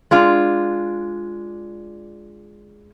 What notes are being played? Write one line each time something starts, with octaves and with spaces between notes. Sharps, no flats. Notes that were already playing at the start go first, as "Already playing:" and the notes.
G#3 D4 F4